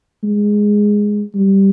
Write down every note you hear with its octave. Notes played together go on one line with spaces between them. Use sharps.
G#3
G3